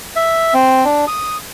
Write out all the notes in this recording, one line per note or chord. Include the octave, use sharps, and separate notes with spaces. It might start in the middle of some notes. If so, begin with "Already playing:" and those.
E5
C4
D4
D#6